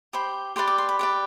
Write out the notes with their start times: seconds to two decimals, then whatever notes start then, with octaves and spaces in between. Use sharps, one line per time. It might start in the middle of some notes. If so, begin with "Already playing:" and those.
0.13 G4 C5 B5
0.56 G4 B4 D5 C6
0.67 D6
0.78 C6
0.89 B5
0.99 G4 B4 D5